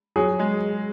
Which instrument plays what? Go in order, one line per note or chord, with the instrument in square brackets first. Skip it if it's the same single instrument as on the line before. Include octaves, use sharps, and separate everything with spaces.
[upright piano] F#3 [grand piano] G#4
[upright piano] G#3